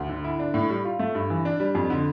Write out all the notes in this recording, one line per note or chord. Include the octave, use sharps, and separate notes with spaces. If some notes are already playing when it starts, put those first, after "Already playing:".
Already playing: D2
D3
E4
D4
A2
G3
F4
A3
G2
E3
D4
G3
F2
D3